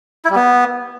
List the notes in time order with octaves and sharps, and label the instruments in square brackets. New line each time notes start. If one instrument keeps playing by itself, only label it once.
[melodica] E4
G3
B3